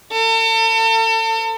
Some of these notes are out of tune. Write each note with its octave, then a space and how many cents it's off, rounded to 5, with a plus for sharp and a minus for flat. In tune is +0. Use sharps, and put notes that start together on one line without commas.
A4 +40